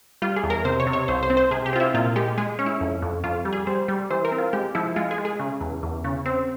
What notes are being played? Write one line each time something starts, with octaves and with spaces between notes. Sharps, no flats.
G3 F4
G#4
E2
A#4
C3 C5
C#5
C3
C#5
C2 C5
C5
C4
C5
C3 G#4
G4
C4 F4
E4
A#2 F4
G#3 G4
G#3 G#4
C#4
E4
F2
F2
F2 F4
G3
G#4
G3 C5
G3
E3 C5
A#4
C4
F4
G#3 G4
F3 E4
G#3 F4
G#4
G#3
G#4
C#3
E2
E2
C#3
C4